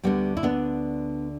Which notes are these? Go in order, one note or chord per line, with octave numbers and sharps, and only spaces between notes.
D2 D3 G3 B3
E4
B3 D4